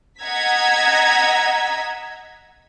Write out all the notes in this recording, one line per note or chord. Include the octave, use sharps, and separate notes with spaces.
D#5 F#5 A#5 E6 G#6 B6